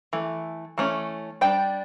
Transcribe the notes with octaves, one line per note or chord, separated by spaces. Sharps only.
E3 A3
E3 A3 C#4
G3 D4 G5